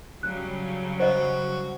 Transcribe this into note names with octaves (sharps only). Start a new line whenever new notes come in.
C#3 F#3 G3 F#6
F#4 C5 D#5